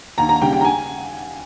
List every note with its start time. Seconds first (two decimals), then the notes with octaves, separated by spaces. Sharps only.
0.18 D#2 A#5
0.29 A#5
0.42 C#3 G3 G5
0.53 G5
0.61 A#5
0.65 G#5